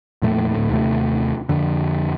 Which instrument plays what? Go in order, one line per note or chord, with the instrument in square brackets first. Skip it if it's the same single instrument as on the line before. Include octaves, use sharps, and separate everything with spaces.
[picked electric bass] F2 A#2 A3
D2 A2
D#2 C3 A3
F2 D3